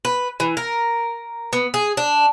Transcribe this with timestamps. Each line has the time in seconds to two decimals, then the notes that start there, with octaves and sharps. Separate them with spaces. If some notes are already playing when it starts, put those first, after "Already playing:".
0.05 B4
0.40 E3
0.57 A#4
1.53 B3
1.74 G#4
1.97 D4